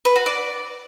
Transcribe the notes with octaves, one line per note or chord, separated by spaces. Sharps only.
B4
F#4
D5